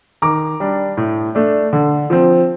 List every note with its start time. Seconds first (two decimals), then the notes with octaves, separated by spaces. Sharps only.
0.22 D#3 A#5 D6
0.60 G3 D4
0.97 A2
1.35 A3 D4
1.73 D3
2.10 F3 C4